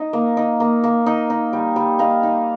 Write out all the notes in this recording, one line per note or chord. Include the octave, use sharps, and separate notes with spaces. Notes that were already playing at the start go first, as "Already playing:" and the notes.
Already playing: D#4
A#3
D#4
A#3
A#3
D#4
D#4
G3
G3
D#4 F5
D#4